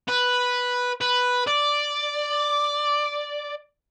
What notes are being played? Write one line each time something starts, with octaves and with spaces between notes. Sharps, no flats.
B4
B4
D5